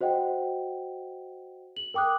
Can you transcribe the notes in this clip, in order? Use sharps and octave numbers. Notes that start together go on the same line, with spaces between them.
F#4 C5 D#5 F#5 G5
F#7
A#4 G5 D6 D#6 F#6